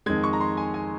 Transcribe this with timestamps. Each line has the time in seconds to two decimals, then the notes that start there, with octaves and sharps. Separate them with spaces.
0.06 F2 D#3 G#3 G#6
0.24 C#6
0.33 A#5
0.40 C6
0.57 G#5
0.74 G#5